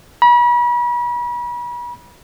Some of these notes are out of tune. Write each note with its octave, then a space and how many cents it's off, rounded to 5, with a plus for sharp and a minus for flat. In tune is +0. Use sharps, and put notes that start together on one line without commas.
B5 -40